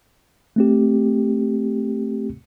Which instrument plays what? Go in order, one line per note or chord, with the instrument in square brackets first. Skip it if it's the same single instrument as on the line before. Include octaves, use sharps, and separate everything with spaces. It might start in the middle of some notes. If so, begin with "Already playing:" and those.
[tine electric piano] A3 C4 G4